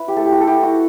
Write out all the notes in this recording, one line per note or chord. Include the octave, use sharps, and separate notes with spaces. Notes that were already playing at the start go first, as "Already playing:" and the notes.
Already playing: E4 B4
G4
A3 A4
G4
F#4
A4
E4 G4
F#4